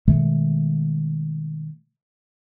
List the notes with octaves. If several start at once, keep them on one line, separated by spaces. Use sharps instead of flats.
B2 D#3 G#3 A3